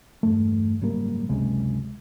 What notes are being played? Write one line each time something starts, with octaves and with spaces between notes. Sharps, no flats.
E2 G2 A3
F#1 G#2 G3 A#3
F#1 C#2 C3 G#3